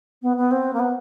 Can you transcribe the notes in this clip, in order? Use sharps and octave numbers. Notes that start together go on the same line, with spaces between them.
B3
B3
C4
A#3
B3